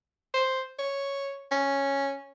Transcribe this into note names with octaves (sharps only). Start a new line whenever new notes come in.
C5
C#5
C#4